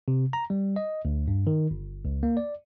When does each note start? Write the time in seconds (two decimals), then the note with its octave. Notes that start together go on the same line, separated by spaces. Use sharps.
0.08 C3
0.33 A#5
0.50 G3
0.76 D#5
1.05 D2
1.28 G2
1.47 D#3
1.71 G1
2.05 C#2
2.23 A#3
2.37 D5